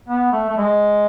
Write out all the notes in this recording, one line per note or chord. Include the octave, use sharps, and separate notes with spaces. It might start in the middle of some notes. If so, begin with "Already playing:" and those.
B3
A3
A3
G#3